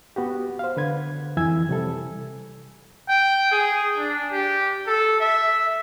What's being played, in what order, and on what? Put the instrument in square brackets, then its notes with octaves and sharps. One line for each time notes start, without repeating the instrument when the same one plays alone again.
[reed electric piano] B3 F#4 G4
C5 F5
D3 B4 G#6
F2 E3 E4 G#5 E6 G#6
C3 G3 A4
[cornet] G5
G#4
D4
G4
A4
E5